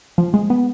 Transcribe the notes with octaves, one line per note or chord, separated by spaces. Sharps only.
F3
G#3
B3